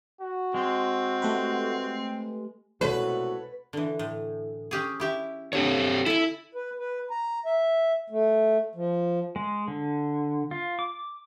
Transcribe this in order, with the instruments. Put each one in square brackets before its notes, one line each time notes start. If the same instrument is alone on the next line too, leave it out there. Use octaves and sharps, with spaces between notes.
[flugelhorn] F#4
[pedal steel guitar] G#3 [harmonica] C4
[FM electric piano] A3 G4 B4
[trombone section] C2 F#4 [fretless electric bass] B2 G#3 A3 [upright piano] A4 C#5 [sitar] B4
[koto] D3 E3
A2
C#4 G4 G#4
E4 G4 E5
[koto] D3 [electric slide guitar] C4 G4 C#5
[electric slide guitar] E4 [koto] A4 G#5
[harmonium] B4
B4
A#5
E5
A3
F3
[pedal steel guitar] G#3
D3
F4
D6